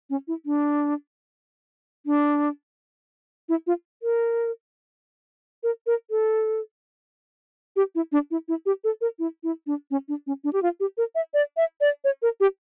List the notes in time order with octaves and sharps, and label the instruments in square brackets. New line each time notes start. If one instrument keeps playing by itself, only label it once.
[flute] C#4
E4
D4
D4
E4
F4
A#4
A#4
A#4
A4
G4
E4
D4
E4
E4
G4
A4
A#4
E4
E4
D4
C#4
D4
C#4
D4
G4
F4
G4
A#4
E5
D5
E5
D5
C#5
A#4
G4